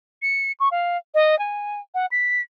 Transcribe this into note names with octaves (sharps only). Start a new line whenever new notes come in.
C#7
C#6
F5
D#5
G#5
F#5
B6